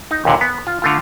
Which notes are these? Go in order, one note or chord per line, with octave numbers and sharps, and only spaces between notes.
D#4
D#2 A#2 D3
B3
F4
D3 A3 F4